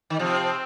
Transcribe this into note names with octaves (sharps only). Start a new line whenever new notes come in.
D#3
C3 F3 C4